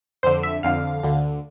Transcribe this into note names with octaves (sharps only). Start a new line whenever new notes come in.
F2 D3 C5
E5
F2 D3 F5
D2 D3